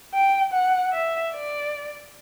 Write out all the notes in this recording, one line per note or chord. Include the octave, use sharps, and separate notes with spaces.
G5
F#5
E5
D5